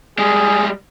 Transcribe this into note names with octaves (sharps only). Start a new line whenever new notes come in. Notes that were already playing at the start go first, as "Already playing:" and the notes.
G3 G#3 G#4